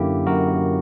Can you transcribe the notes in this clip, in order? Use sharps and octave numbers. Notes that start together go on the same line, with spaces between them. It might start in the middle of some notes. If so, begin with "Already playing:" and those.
Already playing: F#2 D3 A#3 E4 G4
F#2 F#4 A#4